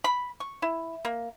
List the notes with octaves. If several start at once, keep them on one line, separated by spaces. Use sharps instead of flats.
B5
C#6
E4
A#3